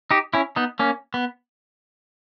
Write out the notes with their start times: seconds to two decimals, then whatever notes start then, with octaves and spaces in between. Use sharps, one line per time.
0.11 D#4 G4
0.34 C#4 E4
0.56 B3 D#4
0.79 A#3 C#4
1.14 B3